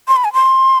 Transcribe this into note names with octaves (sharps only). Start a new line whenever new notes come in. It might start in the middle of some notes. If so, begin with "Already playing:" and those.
C6
B5
G#5
C6